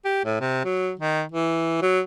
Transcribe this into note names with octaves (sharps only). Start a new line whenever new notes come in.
G4
A2
C3
F#3
D#3
E3
F#3